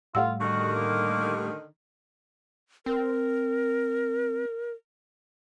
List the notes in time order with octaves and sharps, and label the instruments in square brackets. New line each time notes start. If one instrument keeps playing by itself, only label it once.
[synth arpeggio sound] A2 G3 A3 [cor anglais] F4 [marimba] F5 F#5 E6
[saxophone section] D3 D#3 [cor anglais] F#4
[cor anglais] A#3
[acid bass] C4 [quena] A#4